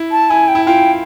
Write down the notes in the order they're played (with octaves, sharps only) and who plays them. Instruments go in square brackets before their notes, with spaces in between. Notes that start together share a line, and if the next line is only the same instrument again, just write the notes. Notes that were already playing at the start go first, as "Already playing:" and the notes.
Already playing: [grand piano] E4
[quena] A5
[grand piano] E4 [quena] G#5
[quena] G5
[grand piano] E4
[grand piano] F4 [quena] G5